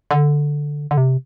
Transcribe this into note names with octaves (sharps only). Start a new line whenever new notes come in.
D3
D3
C3